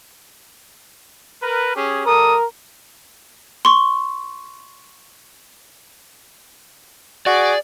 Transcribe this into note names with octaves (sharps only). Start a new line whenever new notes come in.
A#4 B4
C#4 G4 G#4
G3 A4 A#4 D#6
C6 C#6
F#4 G#4 D5